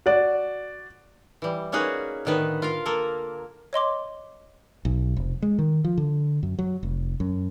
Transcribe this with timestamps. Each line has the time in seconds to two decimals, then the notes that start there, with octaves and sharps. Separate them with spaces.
0.06 F#4 D5
1.42 E3 G3
1.72 A#3 C#4 D#4 F#4 G#4 B4
2.25 A2 D3 D#3 B3 B4
2.62 F4 A#4 F5
2.86 A#3 A4 A#4
3.73 C#5 D#5 C6 D6
4.85 B1
5.16 F1
5.42 G#3
5.59 D#3
5.84 F3
5.98 D3
6.43 F#2
6.59 F#3
6.83 F1
7.20 F#2